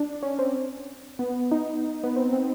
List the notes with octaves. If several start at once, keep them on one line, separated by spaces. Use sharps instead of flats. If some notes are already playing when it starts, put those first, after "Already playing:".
Already playing: D4
C#4
C4
B3
D#4
B3
C4
C4